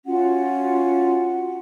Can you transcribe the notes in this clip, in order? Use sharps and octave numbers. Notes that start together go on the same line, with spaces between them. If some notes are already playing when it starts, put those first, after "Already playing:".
C#4 F4 F#4 F#5